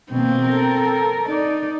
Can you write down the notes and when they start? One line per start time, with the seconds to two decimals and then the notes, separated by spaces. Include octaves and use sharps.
0.12 B2 D#3 A#3 C4
0.44 A4 A#4
1.28 D#4 D5